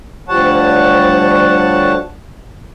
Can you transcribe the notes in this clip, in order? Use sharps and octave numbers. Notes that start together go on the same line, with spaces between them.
D2 F3 G3 C#5 F#5 A5